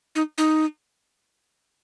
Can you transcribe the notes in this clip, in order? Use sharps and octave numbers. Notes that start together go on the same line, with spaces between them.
D#4
D#4